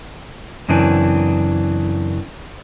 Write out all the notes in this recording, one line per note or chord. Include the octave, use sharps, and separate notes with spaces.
F#2 C#3 E3 C4 D4